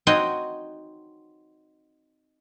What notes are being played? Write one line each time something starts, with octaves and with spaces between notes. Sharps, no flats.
C4 D#4 F#4 C#5 D#5